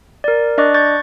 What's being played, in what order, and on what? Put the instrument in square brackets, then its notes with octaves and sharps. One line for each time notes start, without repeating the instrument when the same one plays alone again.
[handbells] A#4 D5
D4 D5 D#5 C#6 D6 F#6
C#6 G6 A6